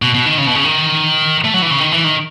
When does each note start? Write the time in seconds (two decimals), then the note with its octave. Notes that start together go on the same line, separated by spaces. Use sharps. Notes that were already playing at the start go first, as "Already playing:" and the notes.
0.02 B2
0.14 B2
0.26 D#3
0.38 C#3
0.47 B2
0.55 C#3
0.64 D#3
1.44 A3
1.54 F#3
1.62 E3
1.71 C#3
1.80 D#3
1.92 E3
2.04 D#3